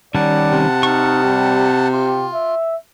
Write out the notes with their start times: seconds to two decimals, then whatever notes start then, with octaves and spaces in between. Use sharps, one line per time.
0.15 D#3 G3 C#4 D5 F#5 A5
0.52 C3
0.83 D#4 C#6 F6
1.24 G3
1.93 F4 G4
2.34 E5